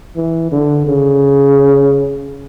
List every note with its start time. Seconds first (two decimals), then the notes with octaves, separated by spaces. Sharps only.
0.16 E3
0.52 D3
0.87 C#3